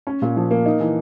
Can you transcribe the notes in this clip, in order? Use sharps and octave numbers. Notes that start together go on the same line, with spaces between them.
C#4
A#2
F3
A#3
D#4
E3